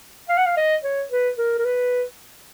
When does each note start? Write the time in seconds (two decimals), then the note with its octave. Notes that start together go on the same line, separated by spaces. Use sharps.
0.29 F5
0.37 F#5
0.46 F5
0.57 D#5
0.84 C#5
1.11 B4
1.38 A#4
1.59 A#4
1.65 B4